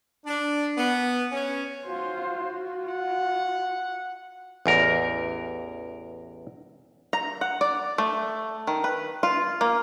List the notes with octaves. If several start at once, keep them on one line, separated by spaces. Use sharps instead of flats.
D4
B3
C#4
F4 F#4 C5
F4
F#5
A1 E2 A#4
A#5
F#5
D5
A3
D#3
B4
F4
A#3